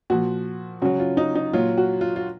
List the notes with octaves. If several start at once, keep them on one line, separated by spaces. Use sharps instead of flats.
A#2 F3 F#4
C#3 F#3 F#4
F4
D#4
D#4
A#2 F#3 F4
F#4
F4
F4